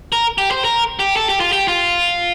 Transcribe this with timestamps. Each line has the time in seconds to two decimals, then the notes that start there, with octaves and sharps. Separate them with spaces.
0.12 A#4
0.38 G4
0.51 C5
0.64 A#4
0.99 G4
1.16 A4
1.29 G4
1.40 F4
1.53 G4
1.68 F4